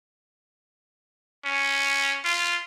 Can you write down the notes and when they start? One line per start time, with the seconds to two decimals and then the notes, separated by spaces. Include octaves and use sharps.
1.45 C#4
2.25 F4